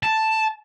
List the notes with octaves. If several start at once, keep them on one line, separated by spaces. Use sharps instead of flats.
A5